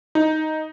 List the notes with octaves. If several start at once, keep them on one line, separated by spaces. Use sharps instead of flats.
D#4